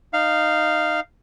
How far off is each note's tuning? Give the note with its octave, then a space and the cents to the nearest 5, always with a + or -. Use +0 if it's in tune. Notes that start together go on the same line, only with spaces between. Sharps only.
D#4 -15 F5 -5